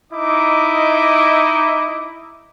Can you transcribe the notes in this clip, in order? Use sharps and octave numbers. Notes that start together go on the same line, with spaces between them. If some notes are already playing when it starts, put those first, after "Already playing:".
D#4 E4 D#5 D6